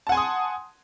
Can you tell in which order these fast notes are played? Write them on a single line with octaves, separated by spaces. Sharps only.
A5 F#5 G#5 C6 D#6